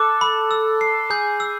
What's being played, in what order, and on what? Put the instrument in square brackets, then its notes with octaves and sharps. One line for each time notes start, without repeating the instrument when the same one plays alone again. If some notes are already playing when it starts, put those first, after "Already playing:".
Already playing: [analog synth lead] A4 [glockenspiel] D6 F#6
[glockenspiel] B5
E6
C7
[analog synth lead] G#4 [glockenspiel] G6
[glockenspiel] E6